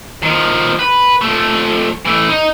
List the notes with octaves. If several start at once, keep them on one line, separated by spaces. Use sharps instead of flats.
D#3 F3
B4
F3 A3
E3 A3
D#4